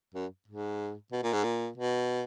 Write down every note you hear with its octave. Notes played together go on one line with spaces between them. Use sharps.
F#2
G#2
B2
A#2
G#2
A#2
B2